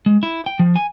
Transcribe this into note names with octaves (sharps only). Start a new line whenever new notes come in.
G#3
E4
G5
F3
G#5